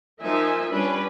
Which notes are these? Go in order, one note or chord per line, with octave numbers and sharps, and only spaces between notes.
F3 D#4 A#4 C5 E5 G#5
G3 C#4 D4 B4